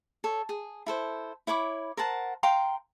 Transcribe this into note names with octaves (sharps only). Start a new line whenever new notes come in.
A4 C#5
G#4
E4 A4 C5
E4 C#5 B5 D6
A#4 C5 F#5 A5
F5 G5 A#5 C6